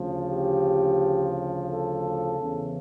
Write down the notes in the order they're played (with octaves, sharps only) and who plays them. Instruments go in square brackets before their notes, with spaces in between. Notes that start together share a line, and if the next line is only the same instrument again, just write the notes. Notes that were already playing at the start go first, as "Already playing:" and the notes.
Already playing: [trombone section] D2 C#3 F3
G4
A4
E2 C#3 E3